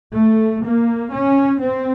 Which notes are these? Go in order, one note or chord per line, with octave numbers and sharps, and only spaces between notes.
A3
A#3
C#4
C4